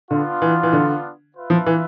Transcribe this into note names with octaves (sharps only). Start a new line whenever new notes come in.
D3 B3 D4 F4
E3
E3
D3
F4 B4 E5
F3
E3